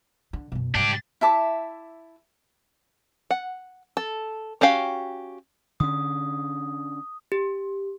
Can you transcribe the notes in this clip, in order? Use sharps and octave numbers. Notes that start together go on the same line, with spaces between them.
D3
F#2 B2
G#2 C#3 D4 G4
E4 E5 A5 D6
F#5
A4
C#4 F#4 G4 F5 G5
D3 C#4 D#6
G4